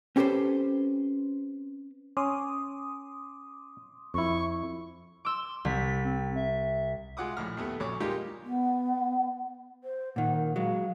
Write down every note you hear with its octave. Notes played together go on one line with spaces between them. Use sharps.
C4 C#4 G4 A4 B4 C5
C#4 C6 D6 D#6
F2 E4 C#6
C6 D6 E6
C2 B6
C4
E5
E5
G#3 F4 F#5 D6 D#6
A#1 A2 F6
D#2 A3 B3
A#1 F#2 C#5 D6
G3 G#3 A#3 D#4 F4 G4
B3
C5
A#2 D#3 F#5
A#4
F#3 G#3 F5